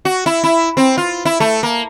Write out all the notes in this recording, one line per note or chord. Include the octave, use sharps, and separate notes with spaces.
F#4
E4
E4
C4
F4
E4
A3
A#3